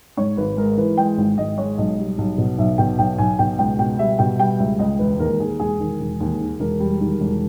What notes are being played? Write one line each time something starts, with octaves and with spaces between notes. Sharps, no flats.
G#2 C#5
G#1 B4
G#3 A#4
E3 B4
G#3 G5
G#1
G#1 D#5
G#3 C#5
B1 D#5
G3
B1
B2
B1 E5
B2 G5
B1 G5
B1 G#5
B2 G5
C#2 G5
B2 G5
G3 E5
B2 G5
G3 G5
C#2 E5
C#2 D#5
E1 B4
D#2 A#4
D#2 G#4
E1 G#4
D#3
E1
D#2
D#3
E1 A#4
G3
D#3
E1